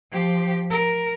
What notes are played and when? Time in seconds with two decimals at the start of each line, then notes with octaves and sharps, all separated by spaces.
0.11 F3 G4
0.70 A#4